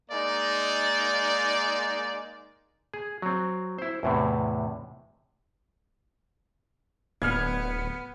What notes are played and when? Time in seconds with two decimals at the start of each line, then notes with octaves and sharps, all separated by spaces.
0.11 G#3 A#3 D#4 D5
2.94 G#4
3.22 F#3 C4
3.78 E4 C5
4.03 E2 A2 C3
7.22 D1 B3 F6 G#6